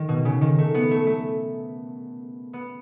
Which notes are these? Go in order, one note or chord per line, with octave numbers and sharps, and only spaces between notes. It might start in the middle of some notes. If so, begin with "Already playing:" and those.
Already playing: D#3
B2
C#3
D#3
A3
B3
A3
A3
B3